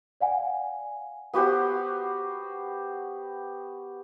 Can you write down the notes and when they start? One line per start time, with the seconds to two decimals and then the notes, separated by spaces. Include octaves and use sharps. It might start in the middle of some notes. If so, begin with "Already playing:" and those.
0.21 D5 F5 F#5 G#5
1.33 B3 F#4 G4 C5